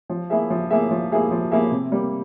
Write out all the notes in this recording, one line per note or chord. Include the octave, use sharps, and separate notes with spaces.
F3
A#3 E4 G#4 E5
F3
A#3 E4 G#4 E5
F3
A#3 E4 G#4 E5
F3
A#3 E4 G#4 E5
C3
G3 A#3